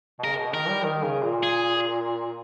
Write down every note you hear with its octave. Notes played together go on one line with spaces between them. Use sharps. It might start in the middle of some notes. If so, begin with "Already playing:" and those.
B2
C#3 A#4
B2
D#3 A#4
G3
D#3
C#3
A#2
G#4